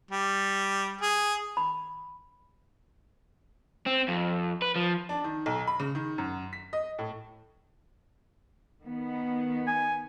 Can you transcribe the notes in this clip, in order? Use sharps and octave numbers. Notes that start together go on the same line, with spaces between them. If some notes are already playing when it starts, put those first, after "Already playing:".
G3
G#4
B5
C4
F2
B4
F3
D4
D#3
B1
B5
C#3
D#3
F#2
B6
D#5
A2
D#3 B3
G#5